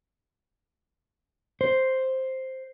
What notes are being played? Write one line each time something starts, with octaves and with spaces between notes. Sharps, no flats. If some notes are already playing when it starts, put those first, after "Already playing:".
C5